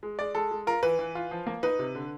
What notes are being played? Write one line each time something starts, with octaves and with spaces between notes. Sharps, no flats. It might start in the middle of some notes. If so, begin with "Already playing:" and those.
G#3
G#3 D5
G#3 A4
G#3
F4 A#4
E3 B4
E3
F4
F3
A#3
D#4 B4
C3
D3